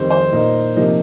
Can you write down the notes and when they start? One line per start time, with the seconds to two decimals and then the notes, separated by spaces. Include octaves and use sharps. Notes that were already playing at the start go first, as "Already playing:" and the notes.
Already playing: F2 D#3 G3 C5
0.11 C5
0.32 A#2 A#3 D#4
0.76 C3 F3 A#3 D#4